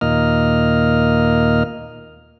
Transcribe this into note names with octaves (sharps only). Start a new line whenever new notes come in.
D#2 A#2 A#3 D#5 F6